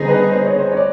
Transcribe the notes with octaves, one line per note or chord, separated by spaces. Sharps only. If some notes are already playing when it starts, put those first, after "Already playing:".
Already playing: D3 G3 B3 D#4 G#4 C5
B4
C5
C#5
C5
C#5
D5